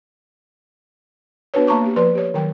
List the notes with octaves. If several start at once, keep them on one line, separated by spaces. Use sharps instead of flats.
B3 D4 F#4 B4 C#5
A#3 A5 A#5 C#6 D6
A#3 G4
F3 B4 D5 C6
G4 C#5
D#3 F#3 G5